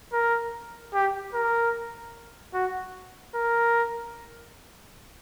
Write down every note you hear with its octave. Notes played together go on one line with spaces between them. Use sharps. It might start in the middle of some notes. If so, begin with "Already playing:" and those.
A#4
G4
A#4
F#4
A#4